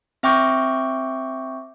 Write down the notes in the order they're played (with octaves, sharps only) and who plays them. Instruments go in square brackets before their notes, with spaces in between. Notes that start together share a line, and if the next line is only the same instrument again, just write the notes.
[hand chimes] C4 E5 G5 C#6 D6 G6